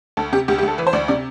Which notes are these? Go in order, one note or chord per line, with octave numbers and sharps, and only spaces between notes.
D2 A4
C3 G4
D2 G4
G4
D2
A4
E3 B4
C5
D2 D5
C3 D5